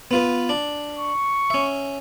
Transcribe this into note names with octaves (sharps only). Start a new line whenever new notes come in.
B3 F4 B4
D4
C#6
C#4 E5